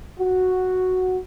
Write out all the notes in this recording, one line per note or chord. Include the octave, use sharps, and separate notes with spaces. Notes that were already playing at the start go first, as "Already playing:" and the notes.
F#4